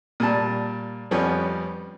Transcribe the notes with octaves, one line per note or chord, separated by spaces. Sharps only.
A#2 G3 A5
F2 F3 G3 B3 C#4